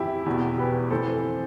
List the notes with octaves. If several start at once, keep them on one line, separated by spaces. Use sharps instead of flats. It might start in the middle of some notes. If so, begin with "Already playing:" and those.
Already playing: F2 E3 E4 G4
E2 B2
G4 B4
F2 E3 A4 C5